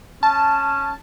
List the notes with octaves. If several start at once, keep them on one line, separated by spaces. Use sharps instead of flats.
C#4 A5